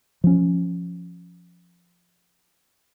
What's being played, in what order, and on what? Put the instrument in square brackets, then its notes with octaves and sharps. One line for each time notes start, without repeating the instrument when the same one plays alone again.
[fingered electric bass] F3 C#4